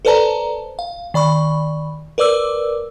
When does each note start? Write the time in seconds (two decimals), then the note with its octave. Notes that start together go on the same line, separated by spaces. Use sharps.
0.05 A4 B4 C5 D5 A5 A#5
0.79 F5
1.14 D#3 D5 B5 C#6
2.18 A#4 B4 D5 D6 E6